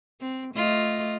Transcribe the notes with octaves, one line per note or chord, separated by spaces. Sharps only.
C4
A3 F4 D#5